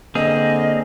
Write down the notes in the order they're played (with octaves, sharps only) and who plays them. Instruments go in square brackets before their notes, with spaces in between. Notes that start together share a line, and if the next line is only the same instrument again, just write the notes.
[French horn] D3 [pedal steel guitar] A#3 C4 G#4 [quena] D#5